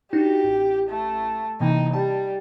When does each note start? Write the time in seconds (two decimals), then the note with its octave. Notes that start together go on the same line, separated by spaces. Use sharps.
0.13 D4 D#4 F#4 G4
0.44 A1
0.89 A3
1.60 C3 E3 A#3 D#4
1.93 G3 A5